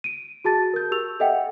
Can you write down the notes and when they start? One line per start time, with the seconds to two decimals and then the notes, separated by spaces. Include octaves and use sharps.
0.04 D7 D#7
0.45 F#4 G#4 A5 A6
0.74 A#4 G6
0.92 G4 E6 F7
1.20 A4 D#5 E5 F#5 G5